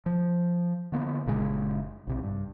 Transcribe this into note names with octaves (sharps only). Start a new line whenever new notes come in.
F3
D3 A#3 B3
F#1 A#2 C#3 G#3
A#1 C3
G2